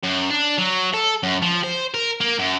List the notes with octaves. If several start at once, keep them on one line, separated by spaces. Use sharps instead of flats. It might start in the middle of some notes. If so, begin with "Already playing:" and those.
F#2
D4
F#3
A4
F#2
F3
C5
A#4
A#3
F#2